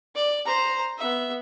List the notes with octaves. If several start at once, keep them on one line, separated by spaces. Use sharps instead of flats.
D5
C5 A#5
B3 E5